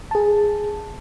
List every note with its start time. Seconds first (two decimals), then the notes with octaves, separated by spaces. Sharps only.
0.11 G#4 A5